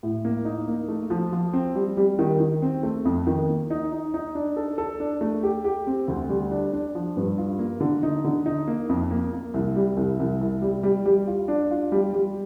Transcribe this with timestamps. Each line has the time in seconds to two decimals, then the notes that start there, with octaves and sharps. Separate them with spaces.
0.03 A2
0.25 A#3
0.45 D#4
0.68 A#3
0.88 A3
1.10 F3
1.33 F3
1.53 C4
1.75 G3
1.97 G3
2.19 D#3
2.40 D#3
2.62 C4
2.83 A3
3.05 F2
3.27 D#3
3.49 A#3
3.70 D#4
3.92 D#4
4.14 D#4
4.35 D4
4.57 A4
4.78 A4
5.00 D4
5.21 A3
5.43 G4
5.64 G4
5.87 C4
6.08 D2
6.29 G3
6.51 D4
6.73 D4
6.95 F3
7.17 G2
7.38 F4
7.59 A#3
7.80 D3
8.03 D#4
8.24 D3
8.46 D#4
8.67 A#3
8.89 F2
9.11 A#3
9.33 A#3
9.54 C2
9.76 G3
9.97 C2
10.19 C2
10.41 C2
10.62 G3
10.83 G3
11.05 G3
11.27 F4
11.48 D4
11.71 F4
11.92 G3
12.13 G3